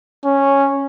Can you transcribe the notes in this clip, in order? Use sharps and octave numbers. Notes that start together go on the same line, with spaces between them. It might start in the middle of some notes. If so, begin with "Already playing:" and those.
C#4